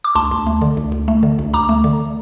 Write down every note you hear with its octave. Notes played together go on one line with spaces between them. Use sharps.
D6
D2 A5 C6
D2
A3
D3
D2
D2
A3
D3
D2
D2 A#5 D6
A3
D3